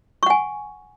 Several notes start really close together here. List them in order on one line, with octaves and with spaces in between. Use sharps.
C#6 F#5 G#5